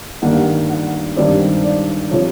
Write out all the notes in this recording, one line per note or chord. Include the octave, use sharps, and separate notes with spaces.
G2 D#3 G3 A#3 F#5
F#5
G2 D#3 G3 C4 D5
D5
C3 F3 C#5